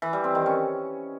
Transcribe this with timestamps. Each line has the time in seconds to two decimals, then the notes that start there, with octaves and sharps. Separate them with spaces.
0.02 E3
0.13 G3
0.24 C4
0.35 D#3
0.46 C#4